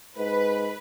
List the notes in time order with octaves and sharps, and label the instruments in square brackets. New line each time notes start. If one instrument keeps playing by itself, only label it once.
[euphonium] G#2 [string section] B4